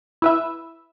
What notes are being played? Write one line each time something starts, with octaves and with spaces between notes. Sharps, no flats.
E4 B4 E5